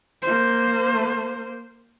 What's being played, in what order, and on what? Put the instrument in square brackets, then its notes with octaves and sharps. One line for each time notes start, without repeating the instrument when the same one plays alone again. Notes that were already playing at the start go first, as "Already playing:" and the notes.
[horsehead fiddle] A#3 C5